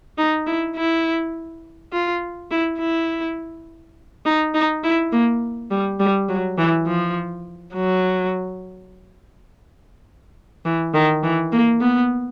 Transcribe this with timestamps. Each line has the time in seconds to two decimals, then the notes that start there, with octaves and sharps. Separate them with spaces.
0.18 D#4
0.47 E4
0.76 E4
1.93 F4
2.51 E4
2.80 E4
4.26 D#4
4.54 D#4
4.84 E4
5.12 A#3
5.71 G3
6.00 G3
6.29 F#3
6.58 E3
6.87 F3
7.74 F#3
10.65 E3
10.94 D#3
11.23 E3
11.53 A#3
11.81 B3